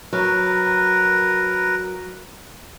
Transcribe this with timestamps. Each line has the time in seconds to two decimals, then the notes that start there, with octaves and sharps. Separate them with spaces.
0.13 F#3 A#4 B4